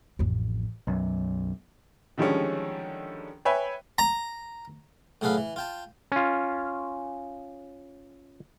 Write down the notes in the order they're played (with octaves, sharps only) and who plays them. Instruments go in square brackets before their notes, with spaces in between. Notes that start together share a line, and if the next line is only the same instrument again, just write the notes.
[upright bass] A1 F2
[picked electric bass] B1 F#2
[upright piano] D3 D#3 F3 G3 G#3 C#4
B4 C#5 E5 G5 G#5 B5
[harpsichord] A#5
A2 F#3 G#4 A4 B4 F5
E3
F4 G5 A5
[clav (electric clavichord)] C#4 F4